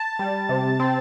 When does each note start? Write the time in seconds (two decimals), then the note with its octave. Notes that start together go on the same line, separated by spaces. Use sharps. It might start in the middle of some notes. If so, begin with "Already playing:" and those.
Already playing: A5
0.19 G3
0.49 C3
0.80 C4